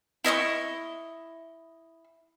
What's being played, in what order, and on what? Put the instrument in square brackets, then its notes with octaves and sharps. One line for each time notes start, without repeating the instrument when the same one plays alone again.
[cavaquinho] E4 D#5 F5 C#6